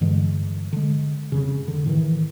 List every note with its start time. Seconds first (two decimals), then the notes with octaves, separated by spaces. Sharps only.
0.01 G2 D3 E3 G#3
0.73 D3 G#3
1.32 F2 C#3
1.68 D3
1.86 A2 D#3 E3